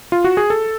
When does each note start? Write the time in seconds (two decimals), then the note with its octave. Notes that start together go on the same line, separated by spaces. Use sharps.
0.12 F4
0.24 F#4
0.37 G#4
0.50 A4